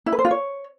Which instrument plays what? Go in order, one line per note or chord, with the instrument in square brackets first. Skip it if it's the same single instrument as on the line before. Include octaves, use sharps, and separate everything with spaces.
[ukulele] E4
B4
C5
F4
C#5